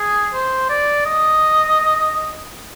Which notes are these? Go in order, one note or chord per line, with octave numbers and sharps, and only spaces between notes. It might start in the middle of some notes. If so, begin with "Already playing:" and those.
Already playing: G#4
C5
D5
D#5